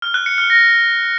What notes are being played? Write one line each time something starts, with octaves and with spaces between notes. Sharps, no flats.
F6
F#6
C#7
F6
A#6